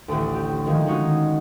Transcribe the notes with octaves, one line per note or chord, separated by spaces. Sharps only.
A1 D2
G4
D#3 F3 G#3
G#3 C#4 D#4 F#4